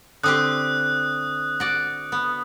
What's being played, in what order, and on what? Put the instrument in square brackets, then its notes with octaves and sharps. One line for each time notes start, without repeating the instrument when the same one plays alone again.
[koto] D3 C4 G4 [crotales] D#6 F#6
[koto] F#4 D5
B3